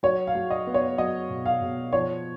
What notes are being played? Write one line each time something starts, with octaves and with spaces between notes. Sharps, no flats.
F#3 C#5
F5
F#3
D#5
B3
C#5
F#3 D#5
B2
F5
B2
F3 C#5